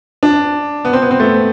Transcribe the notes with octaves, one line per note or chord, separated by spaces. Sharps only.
D4
B3
C4
B3
C4
A3